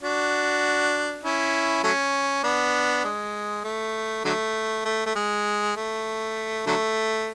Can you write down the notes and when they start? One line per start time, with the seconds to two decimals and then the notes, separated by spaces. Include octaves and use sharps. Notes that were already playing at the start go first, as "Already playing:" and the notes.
0.02 D4 F#4
1.23 C#4 E4
1.84 F#3 A3 C#4
2.44 B3 D4
3.04 G#3
3.64 A3
4.25 D3 F#3 A3
4.85 A3
5.06 A3
5.15 G#3
5.76 A3
6.66 D3 F#3 A3